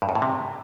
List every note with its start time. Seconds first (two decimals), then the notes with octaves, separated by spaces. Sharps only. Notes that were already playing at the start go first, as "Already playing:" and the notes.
0.02 G2
0.09 F#2
0.15 A2
0.22 C3